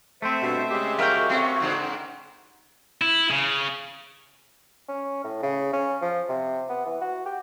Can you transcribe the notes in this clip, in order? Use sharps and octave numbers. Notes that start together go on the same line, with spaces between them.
A3 C4 C5 E5
G2 B2
C#3 G#3 G4
F#4 A#4 E5 F5 G5
C3 A3 C4 C#4
G#2 C#3
E4
C#3
C#4
A2
C#3
C#4
F3
C3
B3
E3
F#4
G4